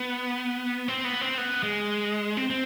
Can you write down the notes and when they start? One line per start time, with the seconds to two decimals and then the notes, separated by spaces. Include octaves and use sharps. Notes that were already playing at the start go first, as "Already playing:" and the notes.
Already playing: B3
0.88 C4
1.05 B3
1.21 C4
1.38 B3
1.63 G#3
2.37 C4
2.50 C4